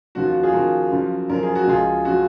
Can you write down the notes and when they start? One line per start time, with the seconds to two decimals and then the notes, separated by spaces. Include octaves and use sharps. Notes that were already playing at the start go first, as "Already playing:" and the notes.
0.15 D#2 C#3 F3 F#4
0.25 F4
0.34 F#4
0.43 F4 G#4
0.53 D#2 C#3 F3 F#4 A#4
0.91 F#2 C#3 F3
1.29 F#2 C#3 F3 A#4
1.43 G#4
1.55 F#4
1.67 C#2 C#3 F3 F4 G#4
2.05 C#3 F3 F#4